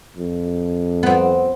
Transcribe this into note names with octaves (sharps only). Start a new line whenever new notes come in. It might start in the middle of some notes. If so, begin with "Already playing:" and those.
F2
B3 C4